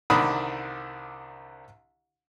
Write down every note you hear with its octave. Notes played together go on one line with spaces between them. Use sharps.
C2 D3 D#3 D4 B5 D#6